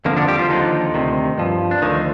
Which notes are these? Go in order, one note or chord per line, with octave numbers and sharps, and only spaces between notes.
F2 D3 F3 A#3
D3 D4
G3 G4
F3 F4
D#2 D3 D#3 F3 D#4
D2 C3 D#3
G2 F3
D4
D2 D3 D#3 F3 D#4